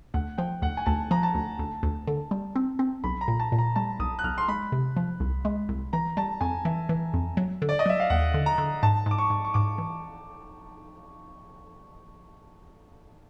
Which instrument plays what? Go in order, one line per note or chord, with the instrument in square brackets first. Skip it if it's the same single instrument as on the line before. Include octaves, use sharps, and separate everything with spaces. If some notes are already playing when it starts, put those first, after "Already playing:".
[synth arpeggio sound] D2 [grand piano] F#5
[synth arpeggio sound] F3 [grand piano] G5
[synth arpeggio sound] D2 [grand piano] F#5
[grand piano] G#5
[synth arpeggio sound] D2 [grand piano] A5
[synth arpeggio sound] F3 [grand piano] A#5
[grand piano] A5
[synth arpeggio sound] D2
D2
D2
D3
G3
C4
C4
[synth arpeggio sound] B1 [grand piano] B5
[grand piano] A#5
[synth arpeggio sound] A#2
[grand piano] A5
[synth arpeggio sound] A#2
[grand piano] A#5
[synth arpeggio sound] G3 [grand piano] A5
[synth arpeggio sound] B1 [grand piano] D#6
[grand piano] F#6
[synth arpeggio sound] B1 [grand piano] F6
[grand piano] C6
[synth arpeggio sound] G#3 [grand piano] B5
[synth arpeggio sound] C3
F3
C2
G#3
C2
[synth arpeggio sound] E3 [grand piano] A#5
[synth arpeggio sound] G3 [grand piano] A5
[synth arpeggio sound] F2 [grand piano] G#5
[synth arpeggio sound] E3 [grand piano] E5
[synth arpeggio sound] E3
F2
F#3
D3
[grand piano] D5
D#5
[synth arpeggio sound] F#3 [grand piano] E5
[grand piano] F5
[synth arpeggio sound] D#2 [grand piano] F#5
[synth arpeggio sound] D3
[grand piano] A#5
[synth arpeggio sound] D3
[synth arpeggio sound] G#2 [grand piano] A5
[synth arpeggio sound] G#2 [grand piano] D6
[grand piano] C#6
[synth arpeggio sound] G#2
[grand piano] C#6
[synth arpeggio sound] G#2 [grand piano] D6
[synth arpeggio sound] E3